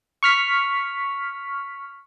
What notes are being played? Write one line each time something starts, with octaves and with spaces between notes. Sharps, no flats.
C#6 F6 B6